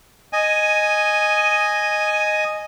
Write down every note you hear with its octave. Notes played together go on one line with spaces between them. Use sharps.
D#5 G#5